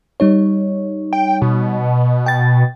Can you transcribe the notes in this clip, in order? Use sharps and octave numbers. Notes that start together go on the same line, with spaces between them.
G3 D#4 C#5
G5
B2
G5 A6